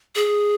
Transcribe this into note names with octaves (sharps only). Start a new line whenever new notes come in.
G#4